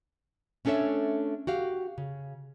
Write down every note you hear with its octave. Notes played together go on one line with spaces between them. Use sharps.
A3 C#4 D4 A4 C#5 E5
F#4 G4 F5
C#3